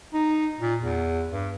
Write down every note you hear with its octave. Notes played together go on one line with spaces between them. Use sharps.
D#4
A#2
E2
G2